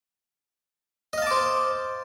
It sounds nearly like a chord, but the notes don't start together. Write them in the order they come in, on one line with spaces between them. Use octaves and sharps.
D#5 F5 A5 D6 C5